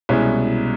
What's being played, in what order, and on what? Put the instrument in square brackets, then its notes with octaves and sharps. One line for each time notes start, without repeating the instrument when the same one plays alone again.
[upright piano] C2 B2 G#3 C#4 E4